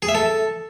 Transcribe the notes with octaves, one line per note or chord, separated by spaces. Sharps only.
G#4
E5
A4